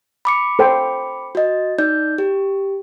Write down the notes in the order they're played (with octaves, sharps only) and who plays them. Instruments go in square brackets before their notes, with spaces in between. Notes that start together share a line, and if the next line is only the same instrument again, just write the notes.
[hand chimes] B5 D6 C#7
[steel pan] A4 C5 G5
[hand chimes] F#4 D#5
D#4 D5 G6
G4